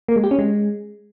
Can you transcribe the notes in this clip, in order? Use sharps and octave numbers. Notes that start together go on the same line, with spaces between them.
A#3
G#3
G4
C#4
G#3